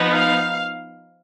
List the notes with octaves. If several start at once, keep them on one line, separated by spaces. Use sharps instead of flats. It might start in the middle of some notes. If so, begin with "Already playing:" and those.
Already playing: F3 B3 D#4
F5